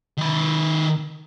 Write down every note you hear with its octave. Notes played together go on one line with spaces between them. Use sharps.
D#3 B4